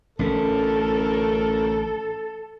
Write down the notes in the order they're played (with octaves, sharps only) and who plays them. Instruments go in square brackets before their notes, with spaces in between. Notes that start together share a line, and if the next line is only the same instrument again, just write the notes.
[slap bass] A1 C#4 [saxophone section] D2 A2 A#4 [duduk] A4